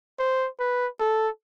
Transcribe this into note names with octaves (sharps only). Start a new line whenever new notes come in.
C5
B4
A4